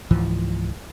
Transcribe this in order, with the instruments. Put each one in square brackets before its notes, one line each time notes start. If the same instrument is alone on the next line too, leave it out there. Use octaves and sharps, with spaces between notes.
[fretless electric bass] C#2 G#2 E3 F3